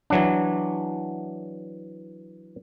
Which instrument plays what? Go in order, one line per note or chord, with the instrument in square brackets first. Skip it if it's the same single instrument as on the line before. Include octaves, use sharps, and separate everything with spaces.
[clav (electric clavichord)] E3 F#3 D4